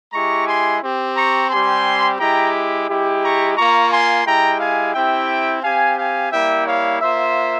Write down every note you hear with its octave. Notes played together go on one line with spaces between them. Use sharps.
G#3 E4 G4 A#5 C#6
G#5 C6
C4 G4
A#5 C#6
G3 C4 G4 G#5 C6
G#3 E4 G4 G5 A#5
G#3 E4 G4
A#5 C#6
A#3 F4 A#5 C#6
G#5 C6
G#3 E4 G4 G5 A#5
F5 G#5
C4 E4 G4 E5 G5
C4 G4 F5 G#5
F5 G#5
G3 A#3 E4 E5 G5
C#5 F5
A#3 F4 C5 E5